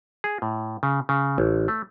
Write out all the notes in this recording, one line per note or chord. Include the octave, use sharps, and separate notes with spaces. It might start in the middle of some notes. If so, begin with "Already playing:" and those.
G#4
A2
C#3
C#3
A1
A3